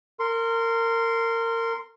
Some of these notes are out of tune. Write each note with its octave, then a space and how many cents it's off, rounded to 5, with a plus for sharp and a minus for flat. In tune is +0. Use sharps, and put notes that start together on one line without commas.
A#4 -25 C6 +0